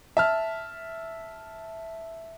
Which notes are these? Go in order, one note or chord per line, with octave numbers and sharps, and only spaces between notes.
E5 A5 F6